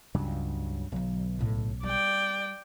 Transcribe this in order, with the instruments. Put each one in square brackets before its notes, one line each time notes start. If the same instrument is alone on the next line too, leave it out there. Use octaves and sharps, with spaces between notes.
[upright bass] C#2 [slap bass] G2 C#3 F#3
[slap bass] B1 [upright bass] D3 F#3
[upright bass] C#2 A2
[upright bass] G3 [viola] D5 G5